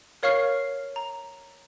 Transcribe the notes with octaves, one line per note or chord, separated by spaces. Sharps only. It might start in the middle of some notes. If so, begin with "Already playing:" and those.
A#4 C#5 F5 C#6 F6 C7
A#5